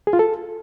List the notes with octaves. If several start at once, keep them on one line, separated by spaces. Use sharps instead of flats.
G#4
F4
A4